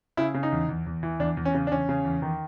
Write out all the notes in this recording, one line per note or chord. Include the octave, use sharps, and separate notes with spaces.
C#3 E4
C#3
D#4
E2
E2
E2
E3
E2 D4
E2
C#4
C#3
D4
E2 C#4
C#3
E2
D#3